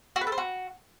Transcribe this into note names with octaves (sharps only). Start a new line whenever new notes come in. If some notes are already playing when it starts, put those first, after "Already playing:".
F#4
B4
A4
C5
F#4